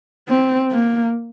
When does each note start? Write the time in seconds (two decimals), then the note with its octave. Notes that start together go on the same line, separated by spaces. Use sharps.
0.29 C4
0.72 A#3